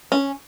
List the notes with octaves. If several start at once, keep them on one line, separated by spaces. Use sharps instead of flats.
C#4